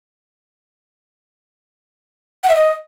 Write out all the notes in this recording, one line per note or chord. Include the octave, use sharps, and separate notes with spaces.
F#5
E5
D#5